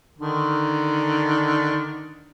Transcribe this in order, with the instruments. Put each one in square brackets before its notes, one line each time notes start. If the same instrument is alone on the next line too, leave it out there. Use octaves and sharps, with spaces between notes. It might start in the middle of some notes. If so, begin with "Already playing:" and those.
[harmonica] D3 D#3